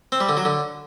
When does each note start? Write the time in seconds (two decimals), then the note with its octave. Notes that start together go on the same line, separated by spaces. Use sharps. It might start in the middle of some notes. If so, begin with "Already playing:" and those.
0.12 C4
0.20 G3
0.29 D3
0.37 F#3
0.45 D3